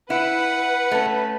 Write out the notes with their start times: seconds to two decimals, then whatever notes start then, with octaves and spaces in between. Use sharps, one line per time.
0.10 E4 B4 F#5
0.91 A3 C#4